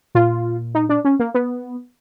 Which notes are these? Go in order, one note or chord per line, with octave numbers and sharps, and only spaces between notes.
A#2 F4
D#4
D4
C#4
A#3
B3